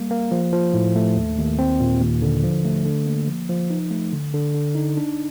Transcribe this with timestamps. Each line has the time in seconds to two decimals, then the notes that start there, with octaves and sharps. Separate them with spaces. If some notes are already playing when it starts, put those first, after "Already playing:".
Already playing: G3 A#3
0.10 A#3
0.31 F3
0.53 F3
0.74 A2
0.96 A3
1.16 D#2
1.37 D#2
1.59 C4
1.80 A#2
2.01 D#2
2.22 D3
2.43 F3
2.65 A3
2.85 D3
3.06 A#3
3.28 F3
3.49 F3
3.70 D#4
3.91 A3
4.12 D3
4.34 D3
4.54 D3
4.75 D#4
4.97 D4